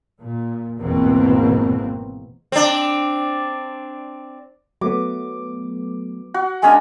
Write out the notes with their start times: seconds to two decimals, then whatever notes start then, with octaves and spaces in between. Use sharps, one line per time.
0.20 A#2
0.80 G#1 E2 B2 E3 A#3 C4
2.52 C4 D4
4.81 F#3 A3 B3 D6
6.34 F#4 F#5
6.63 G#3 C#4 D4 G#5